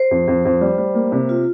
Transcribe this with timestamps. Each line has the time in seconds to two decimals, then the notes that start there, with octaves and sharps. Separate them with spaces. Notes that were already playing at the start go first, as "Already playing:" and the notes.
Already playing: C5
0.11 F2
0.28 F2
0.45 F2
0.61 G3
0.78 G3
0.95 A#3
1.12 C3
1.29 F4